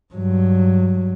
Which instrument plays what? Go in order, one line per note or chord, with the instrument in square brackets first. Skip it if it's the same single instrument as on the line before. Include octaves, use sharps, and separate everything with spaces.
[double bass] G2 F#3